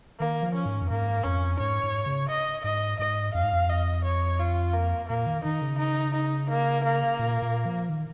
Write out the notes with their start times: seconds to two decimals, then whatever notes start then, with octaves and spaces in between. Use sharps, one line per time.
0.20 D#3 A#3
0.42 F3
0.55 C#4
0.66 G#2
0.82 F2
0.90 G#2 A#3
1.24 F2 C#4
1.60 G#2 C#5
1.83 G#2
2.06 C#3
2.29 D#5
2.64 G#2 D#5
2.99 G#2 D#5
3.34 F2 F5
3.43 G#2
3.53 F2
3.70 D#5
4.05 C#5
4.39 F4
4.74 A#3
5.09 A#2 A#3
5.26 D#3
5.44 D#3 D#4
5.62 C#3
5.79 D#4
6.14 D#4
6.50 A#3
6.84 A#3
7.19 A#2
7.42 A#2
7.65 F3
7.89 D#3